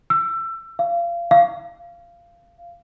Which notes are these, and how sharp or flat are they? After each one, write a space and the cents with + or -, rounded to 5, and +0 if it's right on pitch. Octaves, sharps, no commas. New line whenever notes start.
E6 +25
F5 -25
F5 -15